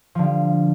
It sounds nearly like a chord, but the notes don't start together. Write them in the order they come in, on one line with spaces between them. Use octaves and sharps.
F3 D3 G3